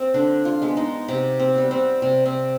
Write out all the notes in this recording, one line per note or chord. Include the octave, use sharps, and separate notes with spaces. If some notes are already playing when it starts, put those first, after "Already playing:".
Already playing: C4
D3 D4
F4
G#3 B3
D#4
C3 G4
C4
G3 B3
C4
C3 C4
C4